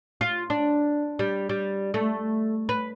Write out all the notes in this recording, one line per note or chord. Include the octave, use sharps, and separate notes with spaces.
F4
D4
G3
G3
A3
B4